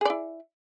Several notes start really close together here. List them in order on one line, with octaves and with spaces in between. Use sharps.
G#4 D5 E4